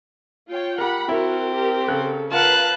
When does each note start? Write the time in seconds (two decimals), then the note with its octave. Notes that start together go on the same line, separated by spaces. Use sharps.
0.49 F4 C#5 G5
0.78 G4 A#4 F#5 B5
1.09 C4 E4 F#4 A#4
1.54 G4 A#4
1.88 C#3 A4 A#4 F#6
2.31 F4 A#4 B4 F5 F#5 A5 F#6